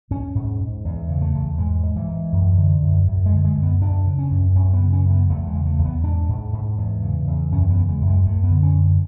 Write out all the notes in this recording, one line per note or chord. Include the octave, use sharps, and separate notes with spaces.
G#2 C#4
G#2
G#2
E2
C#3
A3
E2
G#2 G#3
G#2
E3
G#2
F#2
D3
F#2
F#2
G#3
D3
G#3
F#2
B3
F#2 D4
C#3
C#4
F#2
F#2 C#4
B3
C#3
C#4
F#2
B3
E2 A3
G#3
C#3
A3
E2
B3
G#2 D4
G#2
G#2
E2
C#3
E2
F#2 C#4
B3
C#3
G#3
F#2
G#3
F#2 A3
B3
D3
C#4
F#2